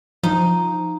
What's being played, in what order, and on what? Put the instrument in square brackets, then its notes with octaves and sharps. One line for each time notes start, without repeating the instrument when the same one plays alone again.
[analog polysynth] F3 [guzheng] D#4